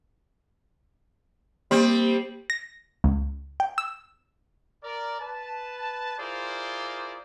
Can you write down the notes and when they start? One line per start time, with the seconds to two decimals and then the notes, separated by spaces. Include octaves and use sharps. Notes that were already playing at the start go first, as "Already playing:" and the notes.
1.71 G3 A#3 C4
2.50 A#6
3.04 C#2
3.60 G5
3.78 E6
4.84 A#4 D5
5.21 B4 A5
6.19 E4 F4 G#4 A#4 C5 D5